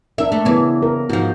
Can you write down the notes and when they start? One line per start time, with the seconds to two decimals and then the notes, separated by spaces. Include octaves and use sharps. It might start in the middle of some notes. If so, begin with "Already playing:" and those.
0.18 D4 A#4 E5
0.32 A3
0.45 C#3 E3 B3
0.83 A#4
1.09 G#2 F3 F#4